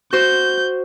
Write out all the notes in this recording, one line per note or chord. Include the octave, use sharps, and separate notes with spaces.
F#4 C5 G6